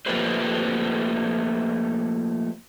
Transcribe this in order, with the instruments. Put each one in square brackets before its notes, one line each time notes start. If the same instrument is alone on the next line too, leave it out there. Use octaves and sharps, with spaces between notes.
[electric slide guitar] F3 A3 A#3 G4 B4 C5